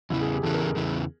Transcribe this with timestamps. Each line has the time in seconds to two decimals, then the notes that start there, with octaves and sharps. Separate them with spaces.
0.10 E2 C#3 E3 E4
0.21 G#4
0.33 G4
0.43 E2 C#3 E3 A4
0.54 A#4
0.65 G#4
0.76 E2 C#3 E3